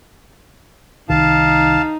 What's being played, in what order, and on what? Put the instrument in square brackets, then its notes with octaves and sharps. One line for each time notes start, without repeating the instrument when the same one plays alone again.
[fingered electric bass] C2 D#3 [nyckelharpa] D#4 [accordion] F5 A5